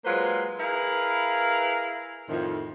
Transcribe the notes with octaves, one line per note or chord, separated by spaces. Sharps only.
F#3 G#3 A#3 F4 B4 C5
E4 G#4 A#4 B4 F5
F2 A2 D#3